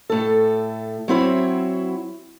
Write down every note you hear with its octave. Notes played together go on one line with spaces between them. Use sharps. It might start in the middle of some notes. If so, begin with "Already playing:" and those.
A2 A4
F#3 C4 E4 C#5